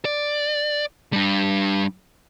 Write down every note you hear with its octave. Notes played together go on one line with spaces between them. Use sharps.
D5
G3 D4